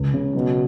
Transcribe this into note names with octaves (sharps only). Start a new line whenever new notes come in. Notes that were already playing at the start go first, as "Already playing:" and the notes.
Already playing: C#2
C#3
B2 F#3